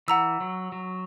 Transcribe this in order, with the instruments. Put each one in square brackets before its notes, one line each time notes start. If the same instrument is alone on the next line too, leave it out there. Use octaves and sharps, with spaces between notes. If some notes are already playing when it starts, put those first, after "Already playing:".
[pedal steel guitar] E3 [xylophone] F#5 A#5 E6
[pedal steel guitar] F#3
F#3